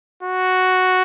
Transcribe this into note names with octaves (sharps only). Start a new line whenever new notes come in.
F#4